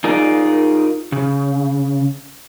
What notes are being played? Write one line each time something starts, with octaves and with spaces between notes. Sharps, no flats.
D#4 F4 G#4 A#4 D5
C#3